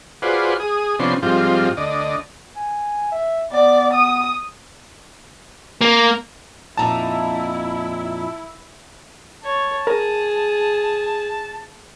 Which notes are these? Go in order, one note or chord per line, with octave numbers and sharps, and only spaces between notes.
F4 F#4 G#4 B4 C5 D5
G#4 D#6
C3 F3 B3 C#4 D4 C6
G#2 F3 G3 C4 F4
D2 D5 D#5
G#5
E5
B3 D5
D#6
A#3
F2 A#2 D#4 E4 A5 A#5
C#5 A5
G#4 A#4